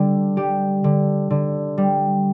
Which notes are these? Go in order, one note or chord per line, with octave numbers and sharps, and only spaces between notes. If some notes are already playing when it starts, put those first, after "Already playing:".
Already playing: D3 G3 D4
G3 G4
D3
D3
G3